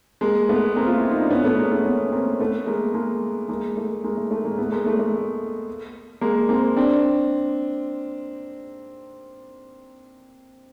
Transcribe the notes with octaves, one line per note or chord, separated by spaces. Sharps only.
G#3 A#3
A3 B3
A#3 C4
F4
E4
D#4
D4
B3 C#4
A3 B3
G#3 A#3
A3 B3
B3 C#4
A#3 C4
A3 B3
G#3 A#3
G#3 A#3
G#3 A#3
A3
G#3 A#3
A3
A3
G#3 A#3
A3 B3
G#3 A#3
A3
A3
G#3 A#3
A#3 C4
C4 D4